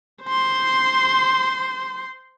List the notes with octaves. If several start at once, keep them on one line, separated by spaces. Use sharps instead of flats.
C5 C6